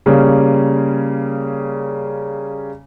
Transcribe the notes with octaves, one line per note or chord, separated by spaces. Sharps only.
C#3 G3 A#3 C#4